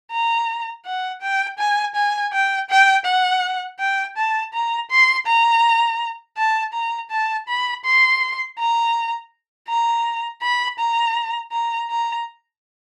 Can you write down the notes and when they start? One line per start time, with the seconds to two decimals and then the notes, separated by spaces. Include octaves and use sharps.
0.12 A#5
0.86 F#5
1.22 G5
1.59 G#5
1.95 G#5
2.33 G5
2.70 G5
3.06 F#5
3.80 G5
4.17 A5
4.53 A#5
4.91 C6
5.26 A#5
6.37 A5
6.74 A#5
7.11 A5
7.48 B5
7.85 C6
8.59 A#5
9.68 A#5
10.42 B5
10.79 A#5
11.52 A#5
11.90 A#5